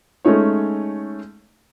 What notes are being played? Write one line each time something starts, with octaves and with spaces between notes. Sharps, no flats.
G#3 A3 C#4 D#4 C#5